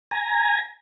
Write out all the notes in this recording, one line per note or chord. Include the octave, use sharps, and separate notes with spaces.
G#5 A#5